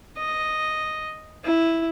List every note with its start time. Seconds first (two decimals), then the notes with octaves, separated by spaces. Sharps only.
0.17 D#5
1.44 E4